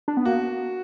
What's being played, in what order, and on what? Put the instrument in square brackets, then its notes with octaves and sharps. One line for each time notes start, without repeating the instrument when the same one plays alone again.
[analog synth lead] D4
B3
[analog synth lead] A#3 [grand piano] F#4